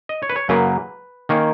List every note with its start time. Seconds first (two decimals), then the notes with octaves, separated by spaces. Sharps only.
0.09 D#5
0.23 C#5
0.30 B4
0.36 C#5
0.49 F#2 C#3 F#3 A#3 B4
1.29 D#3 A#3 C#4